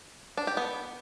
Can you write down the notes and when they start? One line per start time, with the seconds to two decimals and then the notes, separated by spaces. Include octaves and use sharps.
0.38 D4
0.47 G4
0.57 B3